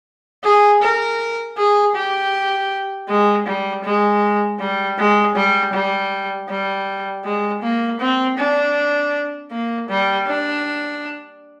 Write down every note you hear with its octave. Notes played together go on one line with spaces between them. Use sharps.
G#4
A#4
G#4
G4
G#3
G3
G#3
G3
G#3
G3
G3
G3
G#3
A#3
C4
D4
A#3
G3
D4